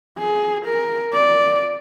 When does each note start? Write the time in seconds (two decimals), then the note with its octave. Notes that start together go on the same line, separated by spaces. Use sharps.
0.19 G#4
0.65 A#4
1.13 D5